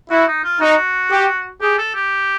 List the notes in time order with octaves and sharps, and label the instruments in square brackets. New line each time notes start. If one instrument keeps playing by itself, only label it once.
[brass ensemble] E4 [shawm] F#4
[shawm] D#4
F4
[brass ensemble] D#4 [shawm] F#4
[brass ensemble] G4
[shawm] G4 [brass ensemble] G#4
[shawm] A4
G4